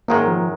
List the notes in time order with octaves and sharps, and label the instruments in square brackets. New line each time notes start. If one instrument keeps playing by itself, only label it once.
[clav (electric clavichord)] G#1 F#2 D#3 G#3 [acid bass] A#3
[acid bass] F3